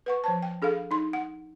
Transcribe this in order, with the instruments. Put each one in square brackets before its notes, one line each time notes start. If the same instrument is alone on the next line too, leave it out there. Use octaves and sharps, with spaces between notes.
[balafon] B4 F#5 C#6
F3 C5 A5
G5
D4 G#4 A4 F5
D#4 C6
F#5